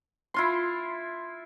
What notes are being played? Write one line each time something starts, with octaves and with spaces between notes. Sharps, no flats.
E4 F4 C6